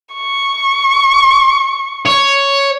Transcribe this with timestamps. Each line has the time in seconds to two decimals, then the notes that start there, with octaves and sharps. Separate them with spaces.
0.15 C#6
2.05 C#5